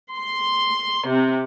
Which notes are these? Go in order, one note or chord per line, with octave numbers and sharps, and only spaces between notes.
C6
C3